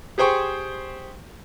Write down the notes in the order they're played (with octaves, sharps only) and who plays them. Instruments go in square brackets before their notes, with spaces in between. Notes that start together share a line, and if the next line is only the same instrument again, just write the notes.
[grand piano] G4 G#4 C5 G5 C#6